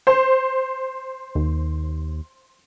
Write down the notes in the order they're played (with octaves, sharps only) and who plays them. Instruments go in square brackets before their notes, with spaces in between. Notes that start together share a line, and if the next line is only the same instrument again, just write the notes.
[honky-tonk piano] C5
[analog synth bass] D#2